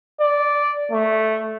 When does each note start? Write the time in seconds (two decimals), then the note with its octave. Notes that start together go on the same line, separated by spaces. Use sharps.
0.21 D5
0.92 A3